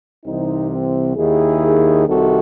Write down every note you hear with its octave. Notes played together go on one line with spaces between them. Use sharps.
C2 C3 E3 C4 D#4
C4
D#2 D#3 E4 G#4
C2 C3 D#3 F#4 A4